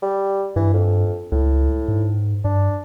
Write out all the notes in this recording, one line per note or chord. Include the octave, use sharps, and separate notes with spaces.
G3
G2 E3
F2
C#2 A2
G#2
G2 D4